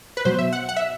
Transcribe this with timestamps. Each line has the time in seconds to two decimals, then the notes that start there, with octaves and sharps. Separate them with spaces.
0.17 B4
0.25 B2 F#3 C5
0.39 E5
0.53 F#5
0.69 F#5
0.76 E5